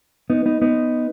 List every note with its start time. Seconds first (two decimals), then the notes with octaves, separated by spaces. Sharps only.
0.30 B3 D#4
0.46 B3 D#4
0.62 B3 D#4